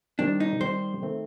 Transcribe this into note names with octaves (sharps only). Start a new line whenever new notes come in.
D#3 G3 C4 D4 G4
D#4
D#3 G3 C4 G4 C5
D#3 A3 C4